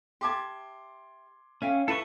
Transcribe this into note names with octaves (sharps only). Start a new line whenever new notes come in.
G4 E5 A5 C6 D6 G#6
C#4 E5 F5 G5
E4 A4 B4 C#6